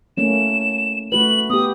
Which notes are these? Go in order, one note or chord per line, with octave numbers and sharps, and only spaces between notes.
A3 A#3 C#4 E7
A3 F#4 B4 F#7
B3 G4 D#6